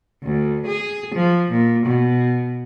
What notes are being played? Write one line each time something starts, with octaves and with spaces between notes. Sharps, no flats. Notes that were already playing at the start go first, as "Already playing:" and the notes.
D2
G#4
F3
A#2
B2